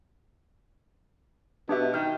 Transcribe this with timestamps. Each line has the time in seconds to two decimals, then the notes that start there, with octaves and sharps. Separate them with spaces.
1.69 B2 D4 G4 E5
1.94 D#3 F6 G6